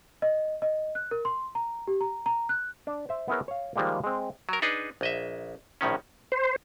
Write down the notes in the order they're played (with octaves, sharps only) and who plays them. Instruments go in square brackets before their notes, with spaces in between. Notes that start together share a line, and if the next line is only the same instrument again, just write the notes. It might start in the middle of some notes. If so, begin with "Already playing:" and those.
[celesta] D#5
D#5
F#6
A#4
C6
A#5
G4
A#5
A#5
F#6
[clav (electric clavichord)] D4
C5 E5
B3 E4 G#4 A#4 C#5
C#5 F5
D#3 F3 G3 G#3 A#3
G#3 C4
F#3 A#4
D4 D#4 G#4 B4
A#1 D#5 E5
A#1 A2 D#3 C#4
[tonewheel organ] C5